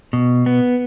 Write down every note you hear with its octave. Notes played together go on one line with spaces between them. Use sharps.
B2
B3